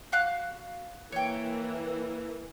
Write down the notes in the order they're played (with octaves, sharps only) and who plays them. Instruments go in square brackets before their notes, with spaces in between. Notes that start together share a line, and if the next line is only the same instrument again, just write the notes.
[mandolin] F#4 F5 F#6
[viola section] E3 A#3 [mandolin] C#5 G5